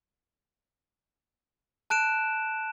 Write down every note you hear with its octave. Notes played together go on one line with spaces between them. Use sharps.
A5 F#6 D7 E7